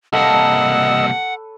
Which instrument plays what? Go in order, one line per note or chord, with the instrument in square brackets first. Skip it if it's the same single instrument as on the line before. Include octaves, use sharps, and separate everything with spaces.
[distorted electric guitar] C2 A#3 [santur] A4 B4 C#5 [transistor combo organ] D#5 E6 [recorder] F#5